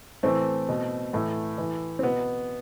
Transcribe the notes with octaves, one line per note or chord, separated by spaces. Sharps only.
A2 E3 A3 C4
B2
A2 E3 A3
A2 E3
C4
B2 B3